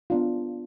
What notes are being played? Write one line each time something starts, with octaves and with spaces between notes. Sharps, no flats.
B3 D4 F4